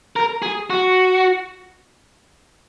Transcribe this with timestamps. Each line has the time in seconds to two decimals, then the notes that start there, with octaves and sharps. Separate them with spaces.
0.16 A#4
0.42 G#4
0.70 F#4